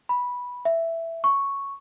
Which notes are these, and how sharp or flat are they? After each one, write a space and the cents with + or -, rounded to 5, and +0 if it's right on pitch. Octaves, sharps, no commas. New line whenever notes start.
B5 -10
E5 +5
C#6 +0